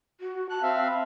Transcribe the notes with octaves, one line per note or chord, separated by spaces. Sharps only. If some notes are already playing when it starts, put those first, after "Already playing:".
F#4
A5 F#6
C4 E5 F5
B5